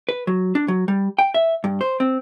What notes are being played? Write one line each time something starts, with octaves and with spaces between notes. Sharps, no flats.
B4
F#3
D4
F#3
G3
G5
E5
G2
C5
C4